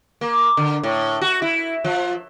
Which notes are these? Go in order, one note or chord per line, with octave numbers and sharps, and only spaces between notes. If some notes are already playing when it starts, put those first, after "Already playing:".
A#3
D3
A2
F#4
E4
F3